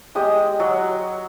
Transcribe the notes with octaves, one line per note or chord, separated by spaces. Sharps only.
G#3 G4 D#5
F#3